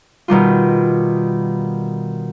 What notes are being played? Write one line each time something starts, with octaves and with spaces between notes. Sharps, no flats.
B2 D#3 G3 F4